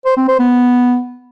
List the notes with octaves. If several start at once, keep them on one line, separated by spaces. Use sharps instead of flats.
C5
C4
C5
B3